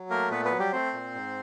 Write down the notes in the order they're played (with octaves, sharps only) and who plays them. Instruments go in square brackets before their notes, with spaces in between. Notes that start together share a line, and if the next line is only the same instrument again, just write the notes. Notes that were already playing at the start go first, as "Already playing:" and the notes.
Already playing: [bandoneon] F#3
A3 A#3 A#4
A#2 B3 B4
B3 B4
F#3
G3 G4
A3 C4 C5
A#2
G#2